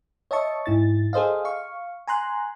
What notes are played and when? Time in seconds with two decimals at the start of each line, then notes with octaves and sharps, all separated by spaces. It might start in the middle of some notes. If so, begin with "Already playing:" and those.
0.31 C#5 D#5 E5 A5 C#6
0.66 G#2 E4 A6
1.13 G#4 A4 C5 D#5 F5
1.45 F5 C#6
2.08 G#5 A#5 C6 F#6